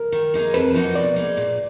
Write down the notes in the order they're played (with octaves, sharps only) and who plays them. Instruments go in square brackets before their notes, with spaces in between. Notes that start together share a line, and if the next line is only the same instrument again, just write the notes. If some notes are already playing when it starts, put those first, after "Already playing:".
Already playing: [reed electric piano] A#4
[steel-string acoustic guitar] D#3
A#3 D#4 G#4
[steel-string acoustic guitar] F2 [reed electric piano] B4
[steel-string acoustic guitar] F3 A#3 D#4 F#4
[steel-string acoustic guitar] B2 [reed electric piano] D5
[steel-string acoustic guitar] A#3 D#4 G#4
A#2